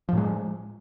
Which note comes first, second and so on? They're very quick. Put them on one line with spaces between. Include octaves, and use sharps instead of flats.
F3 A2 G#3